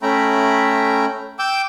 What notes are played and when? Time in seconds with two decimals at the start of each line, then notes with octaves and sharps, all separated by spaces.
0.02 A3 C#4 E5 G5 A#5 B5
1.39 G5 D6 E6 G6